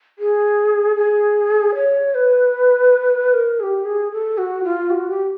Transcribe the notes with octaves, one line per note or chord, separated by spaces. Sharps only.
G#4
G#4
C#5
B4
A#4
G#4
G4
G#4
A4
F#4
F4
G4
F#4
G4